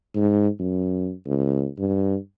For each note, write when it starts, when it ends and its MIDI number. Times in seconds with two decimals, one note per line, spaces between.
0.16 0.48 44
0.59 1.12 42
1.26 1.68 37
1.78 2.16 43